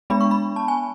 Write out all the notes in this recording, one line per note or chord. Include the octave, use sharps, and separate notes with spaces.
G#3 B3 D4 B5
C#6
B5
A5
G#5